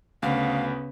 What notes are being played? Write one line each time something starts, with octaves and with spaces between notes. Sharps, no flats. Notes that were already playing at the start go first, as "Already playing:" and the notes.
D2 C#3 B3 F5